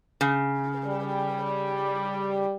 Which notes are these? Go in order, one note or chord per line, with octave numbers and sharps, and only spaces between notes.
C#3
G3